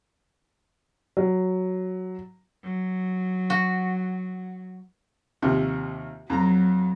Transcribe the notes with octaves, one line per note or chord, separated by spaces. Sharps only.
F#3
F#3
F#4
D#2 C3 F3
F2 F#3 A#5